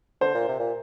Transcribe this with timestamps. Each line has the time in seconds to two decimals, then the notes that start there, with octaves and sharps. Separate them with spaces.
0.21 D3 C5
0.35 A#2
0.48 C3
0.60 A#2